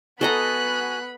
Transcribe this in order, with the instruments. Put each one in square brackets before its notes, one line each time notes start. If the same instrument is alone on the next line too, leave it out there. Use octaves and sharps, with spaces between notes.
[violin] B3 B5 [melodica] F#4 G#5 [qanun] A4 D#5 A#5 [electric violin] F#6